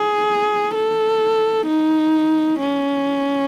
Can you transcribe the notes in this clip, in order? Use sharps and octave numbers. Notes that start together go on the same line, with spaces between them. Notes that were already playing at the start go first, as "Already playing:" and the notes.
Already playing: G#4
A4
D#4
C#4